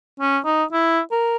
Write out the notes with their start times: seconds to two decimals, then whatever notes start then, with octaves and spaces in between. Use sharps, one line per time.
0.20 C#4
0.45 D#4
0.72 E4
1.12 A#4